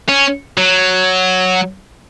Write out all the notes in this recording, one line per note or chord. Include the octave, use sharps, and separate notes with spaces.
C#4
F#3